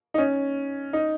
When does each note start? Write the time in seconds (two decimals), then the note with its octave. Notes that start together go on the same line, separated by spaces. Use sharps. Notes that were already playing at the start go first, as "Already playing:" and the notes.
0.14 D#4
0.18 C#4
0.93 D#4